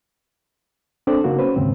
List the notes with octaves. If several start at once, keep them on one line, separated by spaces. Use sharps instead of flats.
C4 D4 A4 C5 D5
C#3 A#3 D#4 F#4
C#4 B4 C5
D#2 G#2 C#3 C4